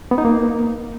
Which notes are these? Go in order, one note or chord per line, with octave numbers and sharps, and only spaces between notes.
B3
D#4
A#3